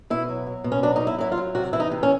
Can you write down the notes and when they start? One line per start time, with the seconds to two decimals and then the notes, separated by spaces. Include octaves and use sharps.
0.10 B2 E4
0.29 F#3
0.47 F#3
0.64 B2
0.72 C#4
0.83 F#3 D4
0.96 D#4
1.01 F#3
1.07 E4
1.18 F#3 E4
1.32 F4
1.37 F#3
1.55 C3 F#4
1.73 E3 E4
1.80 D#4
1.91 C3
2.03 C#4